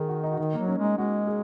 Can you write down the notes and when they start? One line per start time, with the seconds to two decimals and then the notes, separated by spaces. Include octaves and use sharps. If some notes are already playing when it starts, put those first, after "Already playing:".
Already playing: D#3 D#4 G#4 A#4
0.09 F#4
0.23 D#4
0.32 F#4
0.38 D#3 D#4
0.53 F#3 A#3
0.68 C#4
0.78 G#3 D#4
0.98 G#3 F#4
1.27 G#4